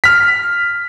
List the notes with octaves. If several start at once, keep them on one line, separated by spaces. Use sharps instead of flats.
F6 B6